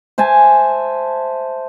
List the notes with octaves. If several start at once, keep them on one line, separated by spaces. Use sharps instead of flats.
C5 E5 G#5 A5